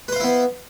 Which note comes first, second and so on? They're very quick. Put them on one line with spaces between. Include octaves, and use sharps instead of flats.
B4 C5 F5 E4 B3